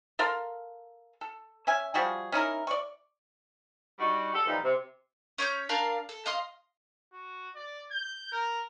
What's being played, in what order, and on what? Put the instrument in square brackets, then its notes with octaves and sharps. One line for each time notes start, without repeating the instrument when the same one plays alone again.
[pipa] A4 A#4 F5 C6
A4
C#4 E5 G#5
F3 G3 F#4 G#4
C#4 D#4 E4 A#4
D5 C#6
[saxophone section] G3 D4 D#4 F#4
G4 A4
A#2 E3 F3 G3 D#4
C3
[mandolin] C#4 C#5 D#6 G6
D4 A#4 F5 A5
A4
D#5 F5 C6 D#6
[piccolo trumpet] F#4
D5
G6
A#4